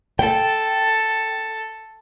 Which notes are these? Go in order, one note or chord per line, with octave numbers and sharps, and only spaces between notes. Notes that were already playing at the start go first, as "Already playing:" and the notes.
A4 G5